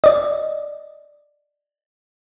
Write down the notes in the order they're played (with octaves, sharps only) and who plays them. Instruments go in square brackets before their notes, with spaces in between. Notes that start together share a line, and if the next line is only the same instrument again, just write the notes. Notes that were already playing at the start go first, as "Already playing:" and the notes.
[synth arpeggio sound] D5 D#5